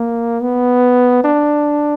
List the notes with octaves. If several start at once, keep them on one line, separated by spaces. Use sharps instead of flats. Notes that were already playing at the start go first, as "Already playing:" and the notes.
Already playing: A#3
B3
D4